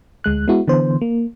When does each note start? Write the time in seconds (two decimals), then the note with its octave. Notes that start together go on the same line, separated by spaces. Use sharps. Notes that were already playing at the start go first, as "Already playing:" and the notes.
0.24 D2 G#3 F#6
0.48 G#3 B3 E4 F#4
0.68 D3 E3 B3 C5
1.01 A#3